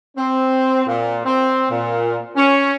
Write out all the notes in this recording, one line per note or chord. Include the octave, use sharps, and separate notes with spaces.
C4
A#2
C4
A#2
C#4